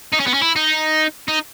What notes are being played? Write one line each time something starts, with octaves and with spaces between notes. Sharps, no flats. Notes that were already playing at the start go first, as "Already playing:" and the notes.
D#4
C#4
B3
C#4
E4
D#4
D#4